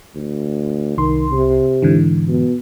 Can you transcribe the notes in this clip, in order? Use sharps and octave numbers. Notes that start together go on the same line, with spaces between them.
D2
C2 D#3 C6
C3
G#2 D3 E3
B2